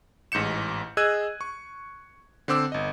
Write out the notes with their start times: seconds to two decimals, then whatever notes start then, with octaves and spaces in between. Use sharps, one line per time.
0.32 A1 G#2 G6 C#7 E7
0.97 G#4 D#5 E6 F#6 G#6 D#7
1.41 C#6
2.48 D3 C4 C5 D6 E6
2.72 G1 D#5